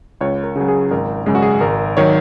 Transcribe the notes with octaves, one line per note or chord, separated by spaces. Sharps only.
C#2 C#5
A#4
C#3 F#3
G#4
G#1 A#4
F#2 C#3 G#3 G#4
F#4
G#4
G#1 A#4
D#3 F#3 C#5